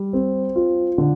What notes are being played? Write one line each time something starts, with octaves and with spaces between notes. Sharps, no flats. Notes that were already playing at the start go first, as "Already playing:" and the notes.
Already playing: G3
C4
F4
D3